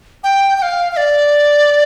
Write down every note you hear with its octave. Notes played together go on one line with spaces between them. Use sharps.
G5
G5
F5
F5
D5